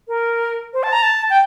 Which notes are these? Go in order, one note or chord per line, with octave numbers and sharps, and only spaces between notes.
A#4
C5
A5
A#5
A5
G5